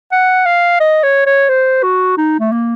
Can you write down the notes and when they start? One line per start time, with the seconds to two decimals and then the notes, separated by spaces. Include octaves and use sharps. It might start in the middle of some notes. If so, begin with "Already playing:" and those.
0.12 F#5
0.46 F5
0.80 D#5
1.03 C#5
1.26 C#5
1.49 C5
1.83 F#4
2.18 D#4
2.40 A3
2.52 A#3